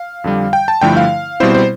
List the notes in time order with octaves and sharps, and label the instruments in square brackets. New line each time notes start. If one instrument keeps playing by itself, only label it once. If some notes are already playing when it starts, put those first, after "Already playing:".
Already playing: [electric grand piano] F5
F2 D3 G3
G5
A5
G2 D3 F3 A3 E4 G5
F5
B2 G3 C4 E4 C5
C5